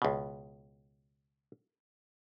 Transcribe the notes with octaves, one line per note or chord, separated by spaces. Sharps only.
C#2 B2